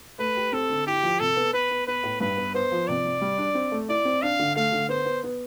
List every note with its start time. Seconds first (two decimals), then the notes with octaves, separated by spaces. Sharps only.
0.19 A3 B4
0.37 G4
0.52 C4 A4
0.70 D3
0.87 E4 G4
1.03 F3
1.19 C3 A4
1.36 B3
1.53 B3 B4
1.71 B3
1.87 B3 B4
2.03 A2
2.20 G2 B4
2.37 B3
2.54 B3 C5
2.72 F3
2.87 C3 D5
3.05 C3
3.21 G3
3.38 D4
3.55 C4
3.72 A3
3.89 E4 D5
4.05 C4
4.22 D4 F5
4.39 D3
4.56 A3 F5
4.72 D3
4.89 B3 C5
5.06 B3
5.24 B3